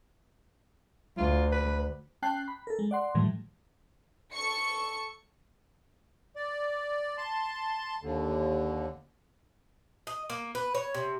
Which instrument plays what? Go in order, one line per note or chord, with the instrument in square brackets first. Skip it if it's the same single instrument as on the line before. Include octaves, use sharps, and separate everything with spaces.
[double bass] D2 [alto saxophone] F4
[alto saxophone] B4
[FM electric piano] C#4 G5 A5 F#6 C7
B5
A4 A#4
G#3
D5 F#5 C6
A2 D#3 E3 F#3 G3 A3
[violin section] A4 C#6 C#7
[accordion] D5
A5 C6
D#2 D3
[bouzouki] D#5
A#3
B4
C#5
C3